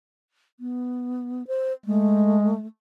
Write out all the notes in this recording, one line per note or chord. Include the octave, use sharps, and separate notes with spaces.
B3
C5
G#3 A3